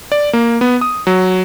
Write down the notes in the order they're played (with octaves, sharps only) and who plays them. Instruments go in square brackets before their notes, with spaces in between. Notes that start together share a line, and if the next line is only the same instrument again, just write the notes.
[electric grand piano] D5
A#3
B3
D#6
F#3